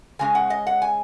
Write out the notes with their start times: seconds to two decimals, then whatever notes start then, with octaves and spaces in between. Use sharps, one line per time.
0.19 C#3 G#3 C#4 G#5
0.35 F#5
0.50 D#5
0.67 F#5
0.82 G#5